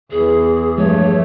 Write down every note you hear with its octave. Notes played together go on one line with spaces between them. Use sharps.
E2 E3 G#4
G2 F3 G#3 A3 C#5